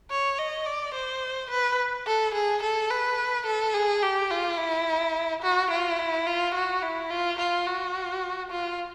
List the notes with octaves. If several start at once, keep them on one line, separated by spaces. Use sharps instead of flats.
C#5
D#5
D5
C5
B4
A4
G#4
A4
B4
A4
G#4
G4
F4
E4
F#4
F4
E4
F4
F#4
E4
F4
F4
F#4
F4